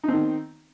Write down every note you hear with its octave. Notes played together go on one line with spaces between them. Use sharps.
D#3 C4 D#4